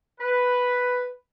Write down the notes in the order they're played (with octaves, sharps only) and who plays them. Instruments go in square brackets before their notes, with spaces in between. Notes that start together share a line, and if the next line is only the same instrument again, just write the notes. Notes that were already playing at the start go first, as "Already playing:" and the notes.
[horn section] B4